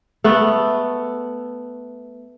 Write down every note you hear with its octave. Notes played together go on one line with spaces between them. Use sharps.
A3 B3